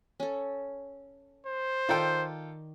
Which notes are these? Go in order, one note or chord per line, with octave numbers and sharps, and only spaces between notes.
C#4 A4
C5
D#3 F4 A4 D5 G5